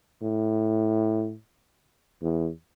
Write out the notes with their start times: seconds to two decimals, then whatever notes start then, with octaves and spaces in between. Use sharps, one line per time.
0.22 A2
2.22 E2